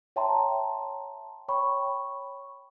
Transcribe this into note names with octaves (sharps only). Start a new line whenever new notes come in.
C#5 E5 G5 A5 A#5 C6
C#5 G5 B5 C#6